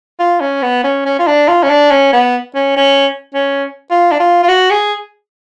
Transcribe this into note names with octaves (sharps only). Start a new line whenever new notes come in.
F4
C#4
B3
C#4
C#4
F4
D4
F4
C#4
D4
C#4
B3
C#4
C#4
C#4
F4
D4
F4
F4
F#4
G#4